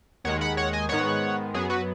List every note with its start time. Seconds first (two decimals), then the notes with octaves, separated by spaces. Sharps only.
0.24 D#2 D#3 G#3 C#5 F#5
0.41 F#5 B5
0.57 C#5 F#5
0.73 D#5 G#5
0.89 G#2 D#3 G#3 B3 C#5 F#5
1.54 F#2 F#3 B3 G#4
1.70 F#4 B4